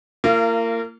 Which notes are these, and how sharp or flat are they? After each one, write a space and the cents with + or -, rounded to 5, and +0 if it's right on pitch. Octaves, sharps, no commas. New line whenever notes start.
A#3 -25 F4 -40